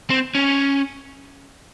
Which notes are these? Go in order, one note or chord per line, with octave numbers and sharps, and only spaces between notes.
C4
C#4